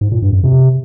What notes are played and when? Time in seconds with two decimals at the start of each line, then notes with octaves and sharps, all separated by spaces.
0.01 G#2
0.12 A#2
0.22 G2
0.33 F#2
0.43 C3